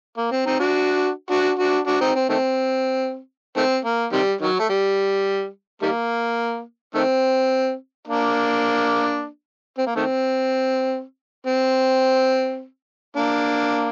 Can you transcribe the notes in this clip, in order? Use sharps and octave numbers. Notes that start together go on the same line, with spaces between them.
A#3
C4
C4 D#4
D4 F#4
D4 F#4
D4 F#4
D4 F#4
C4 D#4
C4
D#3 A3 C4
D#3 A3 C4
A#3
C3 D#3 G3
D#3 F#3
A3
G3
D#3 G3 A#3
D#3 A3 C4
A#3 D4
C4
A#3
D#3 A3 C4
C4
A#3 D4